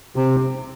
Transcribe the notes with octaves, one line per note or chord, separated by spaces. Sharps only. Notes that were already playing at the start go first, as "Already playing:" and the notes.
C3